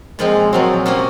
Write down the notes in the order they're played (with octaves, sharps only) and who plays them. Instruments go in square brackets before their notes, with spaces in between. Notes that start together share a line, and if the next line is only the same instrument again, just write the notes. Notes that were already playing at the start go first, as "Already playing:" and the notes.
[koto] A#2 F3 C4 [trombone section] G#3
[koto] A#2 F3 C4 [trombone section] F#3
[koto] C3 F3 A#3 C#4